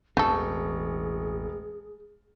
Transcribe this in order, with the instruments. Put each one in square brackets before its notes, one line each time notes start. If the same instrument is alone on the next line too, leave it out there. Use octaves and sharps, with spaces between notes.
[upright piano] E1 C#6 [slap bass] A1 C4 [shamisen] A3 A4 [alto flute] G#4